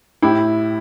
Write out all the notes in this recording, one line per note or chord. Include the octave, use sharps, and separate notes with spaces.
A2 E4 G4